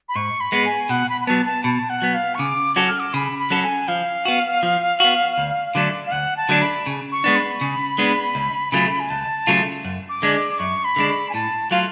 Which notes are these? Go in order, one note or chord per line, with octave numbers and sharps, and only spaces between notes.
B5
G#2 C#6
B5
G#3 B3
G#5
B2 F#5
B5
B5
F#3 B3 A5
A5
B2 A5
F#5
F#3 B3
F5
C#6
C#3 D6
F#3 C#4 F#4 A4 D6
F6
D6
C#3 B5
B5
F#3 C#4 F#4 A4
G#5
F3 F5
B3 F#4
F3
B3 F#4
D2
D3 F#3 A3 D4
F5
D2 F#5
A5
D3 F#3 A3 D4
B5
C#3
C#6
G#3 B3 D4
B5
C#3
G#3 B3 D4
C#2
C#3 F#3 A3 F4
G#5
C#2 A5
C#3 F#3 A3 F4
F#2
D6
D3 G#3 D4
D6
F#2 C#6
B5
D3 G#3 D4
B5
G#5
A2 A5
F#3 A3 F4 F5